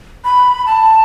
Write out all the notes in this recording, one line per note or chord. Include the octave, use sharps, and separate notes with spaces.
B5
A5